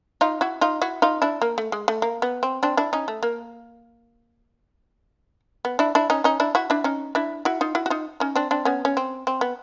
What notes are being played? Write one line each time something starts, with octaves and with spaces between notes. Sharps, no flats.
D#4 F4
E4 F#4
D#4 F4
E4 F#4
D#4 F4
D4 E4
A#3
A3
G#3
A3
A#3
B3
C4
C4 D4
D4 E4
C#4 D#4
A3
A#3
B3
D4 E4
D4 E4
C#4 D#4
C#4 D#4
D4 E4
E4 F#4
D4 E4
C#4 D#4
D4 E4
E4 F#4
D#4 F4
E4 F#4
F#4
D#4 F4
C#4 D#4
C4 D4
C4 D4
B3 C#4
C#4
C4
C4
B3